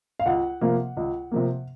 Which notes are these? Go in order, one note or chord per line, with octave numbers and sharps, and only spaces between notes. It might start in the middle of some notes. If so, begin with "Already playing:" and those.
F5
C#2 F#5
C3 F3 A#3
C#2
C3 F3 A#3